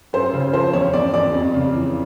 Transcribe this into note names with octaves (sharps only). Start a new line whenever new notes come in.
F#2 C5
C#3
F3 C5
E2 C#5
E2 D5
E2 D5
F2
C#3
E3